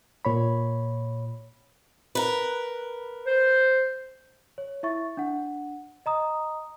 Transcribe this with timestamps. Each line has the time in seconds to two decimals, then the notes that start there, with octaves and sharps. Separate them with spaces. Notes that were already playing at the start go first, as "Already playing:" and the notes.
0.25 A#2 C#5 B5
2.15 A#4 B4
3.26 C5
4.58 C#5
4.83 E4 E5 C#6 A6
5.17 D4 F#5
6.06 D#5 A#5 D#6